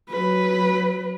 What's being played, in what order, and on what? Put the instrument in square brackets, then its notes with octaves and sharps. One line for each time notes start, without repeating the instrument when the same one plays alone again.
[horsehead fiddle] F#3 B4